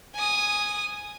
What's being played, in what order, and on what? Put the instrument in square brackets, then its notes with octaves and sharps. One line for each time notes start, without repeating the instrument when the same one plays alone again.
[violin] G#5 D#6